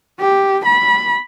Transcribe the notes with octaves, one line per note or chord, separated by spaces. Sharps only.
G4
B5